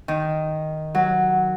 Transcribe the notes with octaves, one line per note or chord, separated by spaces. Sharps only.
D#3
F#3